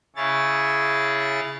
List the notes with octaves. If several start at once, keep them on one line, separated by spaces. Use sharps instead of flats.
C#3 E4 G#4 C#5 A6